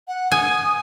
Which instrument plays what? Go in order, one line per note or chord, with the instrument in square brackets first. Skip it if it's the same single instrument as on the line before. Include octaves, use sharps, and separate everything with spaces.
[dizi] F#5
[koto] G#5 [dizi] D#6